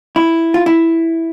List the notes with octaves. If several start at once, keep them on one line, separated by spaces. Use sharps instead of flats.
E4
F4
E4